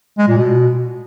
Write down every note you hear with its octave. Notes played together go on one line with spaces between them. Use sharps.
G#3
A#2
B2